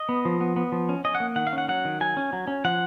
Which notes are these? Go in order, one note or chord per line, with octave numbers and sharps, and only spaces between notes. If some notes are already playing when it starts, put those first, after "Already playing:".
Already playing: D#5
B3
F3
B3
B3
F3
C#4
C#4 D#5
F#5
A#3
D#3 F#5
F5
C#4
F#5
F#3 F#5
D#3
F#3 G#5
C#4
F#3
C#4
F3 F#5